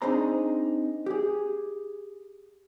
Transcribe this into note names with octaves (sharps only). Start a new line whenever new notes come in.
C4 D4 D#4 G#4 C5 A#5
G4 G#4